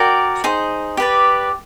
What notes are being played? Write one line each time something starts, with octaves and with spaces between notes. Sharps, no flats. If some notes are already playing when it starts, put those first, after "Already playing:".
Already playing: F#4 A#4 D5 G5
D#4 G#4 C5
G4 B4 D5